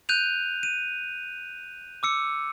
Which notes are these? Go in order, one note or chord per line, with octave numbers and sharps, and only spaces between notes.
F#6 G6 D#7 F7
D#7
D6 E6 C#7